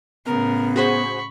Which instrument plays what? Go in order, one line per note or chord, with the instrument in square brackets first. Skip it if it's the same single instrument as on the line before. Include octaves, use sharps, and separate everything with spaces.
[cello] A2 C#3 [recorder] B3 [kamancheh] A#4
[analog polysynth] F#4 G#4 C5 [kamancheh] B5 C#6